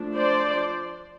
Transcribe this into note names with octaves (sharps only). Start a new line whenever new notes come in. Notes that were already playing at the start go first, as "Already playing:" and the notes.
Already playing: F3 A3 D4
C5 D5